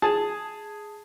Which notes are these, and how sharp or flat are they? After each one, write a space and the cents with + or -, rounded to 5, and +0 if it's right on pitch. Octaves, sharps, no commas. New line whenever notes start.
G#4 +0 A5 +0